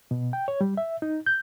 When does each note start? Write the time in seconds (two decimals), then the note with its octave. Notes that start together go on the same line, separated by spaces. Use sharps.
0.11 B2
0.33 G5
0.48 C#5
0.61 G3
0.77 E5
1.02 D#4
1.26 G6